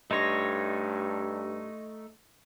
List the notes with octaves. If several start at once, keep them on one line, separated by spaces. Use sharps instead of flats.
G2 A3 D#4 C#5 D#5 C6 A#6